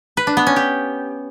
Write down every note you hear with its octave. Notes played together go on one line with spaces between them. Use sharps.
B4
D4
B3
C#4
G4